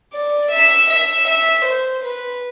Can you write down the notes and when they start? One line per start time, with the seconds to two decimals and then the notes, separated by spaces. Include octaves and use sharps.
0.13 D5
0.51 E5
0.90 E5
1.27 E5
1.65 C5
2.04 B4